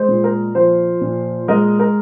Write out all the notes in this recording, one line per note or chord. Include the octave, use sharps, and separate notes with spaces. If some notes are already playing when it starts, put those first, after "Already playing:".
Already playing: G#3 C5
A#2
A#4
F3 C5
A#2
G#3 A#4 D#5
A#4